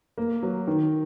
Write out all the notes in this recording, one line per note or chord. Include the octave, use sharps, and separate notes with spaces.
A#3
F#3
D#3